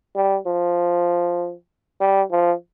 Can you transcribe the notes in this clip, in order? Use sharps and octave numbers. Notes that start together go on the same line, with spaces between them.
G3
F3
G3
F3